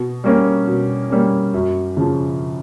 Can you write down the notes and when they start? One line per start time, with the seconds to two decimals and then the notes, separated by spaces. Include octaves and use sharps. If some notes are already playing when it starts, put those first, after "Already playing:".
Already playing: B2
0.24 G3 A#3 C#4
0.67 B2
1.10 G3 A#3 C#4
1.54 F#2
1.97 C#3 F3